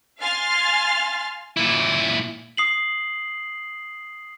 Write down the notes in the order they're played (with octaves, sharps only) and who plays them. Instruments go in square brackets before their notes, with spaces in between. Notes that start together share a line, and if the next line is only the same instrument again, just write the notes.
[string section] F5 G#5 C6 F6 A6
[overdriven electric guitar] A#2 E4
[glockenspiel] D#6 C7 F#7